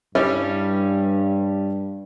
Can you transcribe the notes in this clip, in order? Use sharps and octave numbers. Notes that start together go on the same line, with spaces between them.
G2 G3 C#4 E4